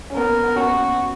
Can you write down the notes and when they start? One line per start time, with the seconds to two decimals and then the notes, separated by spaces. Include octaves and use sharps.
0.10 C#4
0.16 B3 A#4
0.44 B3
0.55 C#4 F#4
0.67 B3